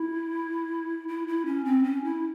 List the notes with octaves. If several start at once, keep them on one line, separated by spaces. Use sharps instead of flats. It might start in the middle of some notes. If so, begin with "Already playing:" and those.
Already playing: E4
E4
E4
C#4
C4
C#4
E4